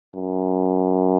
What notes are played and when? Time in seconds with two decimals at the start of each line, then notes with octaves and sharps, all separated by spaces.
0.15 F#2